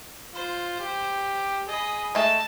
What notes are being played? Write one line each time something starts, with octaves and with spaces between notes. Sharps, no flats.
F4 C5
G4
G#4 D#5 B5
G#3 A3 A5